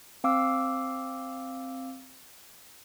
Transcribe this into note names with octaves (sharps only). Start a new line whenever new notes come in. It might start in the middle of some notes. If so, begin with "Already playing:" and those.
C4 F5 D6 E6